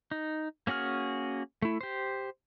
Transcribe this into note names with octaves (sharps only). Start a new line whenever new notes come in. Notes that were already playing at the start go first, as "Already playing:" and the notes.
D#4
A#3 C#4 F#4 G#4 F6
A3 E4
G4 C5